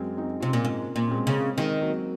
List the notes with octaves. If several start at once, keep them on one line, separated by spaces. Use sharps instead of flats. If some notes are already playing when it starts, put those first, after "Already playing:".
Already playing: F#2 G#3 C4
C4 D#4
C3 C#4 F4
A#2
G#2 A#3 C#4
A#2
C#4
G#3 C4
C#3
D#3 G#3 C4
F#3 A#3